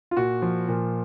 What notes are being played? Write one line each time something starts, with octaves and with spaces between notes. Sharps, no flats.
F4
A#2 F#4
F3
A#2